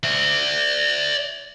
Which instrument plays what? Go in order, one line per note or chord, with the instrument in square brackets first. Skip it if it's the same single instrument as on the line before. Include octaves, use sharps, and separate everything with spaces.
[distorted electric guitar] D5 E5